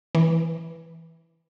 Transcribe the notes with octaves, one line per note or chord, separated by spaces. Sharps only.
E3